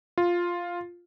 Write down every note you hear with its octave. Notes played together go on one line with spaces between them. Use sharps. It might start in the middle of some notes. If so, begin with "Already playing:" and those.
F4